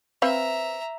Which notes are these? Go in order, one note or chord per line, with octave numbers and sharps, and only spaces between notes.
C4 B4 E5 F5 A#5